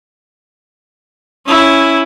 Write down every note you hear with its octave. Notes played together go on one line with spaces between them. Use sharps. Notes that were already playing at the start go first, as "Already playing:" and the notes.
C#4 E4